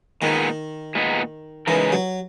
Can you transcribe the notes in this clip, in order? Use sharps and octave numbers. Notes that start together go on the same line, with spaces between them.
A#2 D#3 G#3 B3 D#4
A#2 G#3 B3 D#4
C#3 E3 G#3 D#4 A#4
F#3